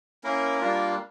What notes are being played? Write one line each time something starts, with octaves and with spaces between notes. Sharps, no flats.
A#3 C#4 E4 A#4
G3 A#3 D4 F4